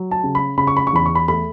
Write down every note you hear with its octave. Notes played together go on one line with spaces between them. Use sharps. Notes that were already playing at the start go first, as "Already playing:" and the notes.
Already playing: F#3
A5
C#3
B5
C#3 B5
C#6
B5
C#6
E2 B5
C#6
B5
A3 B5